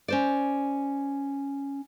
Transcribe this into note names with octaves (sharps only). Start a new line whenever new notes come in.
C#4 C5 D5